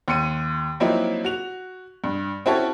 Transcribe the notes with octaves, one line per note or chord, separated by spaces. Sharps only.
D#2 C6 C#7 D#7
F3 F#3 A#3 C4 D#4 E4
F#4 F7
G2
C4 C#4 E4 F#4 A4 C#5